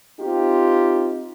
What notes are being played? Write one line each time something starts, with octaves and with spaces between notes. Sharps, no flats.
C4 D#4 F4 G4